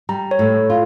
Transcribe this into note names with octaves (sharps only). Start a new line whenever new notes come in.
G3 A#5
C#5
A2
F4